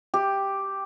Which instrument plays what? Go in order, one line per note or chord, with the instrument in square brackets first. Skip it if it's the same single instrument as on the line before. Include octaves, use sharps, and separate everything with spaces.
[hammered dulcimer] G4